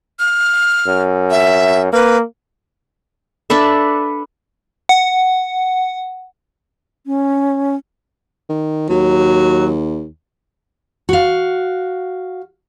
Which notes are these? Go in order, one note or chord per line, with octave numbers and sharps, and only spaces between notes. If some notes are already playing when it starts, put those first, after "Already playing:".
F6
F#2
E5
A#3 B4
D4 A4 B4 E5
F#5
C#4
D#3
D#2 F#3
F#4 F5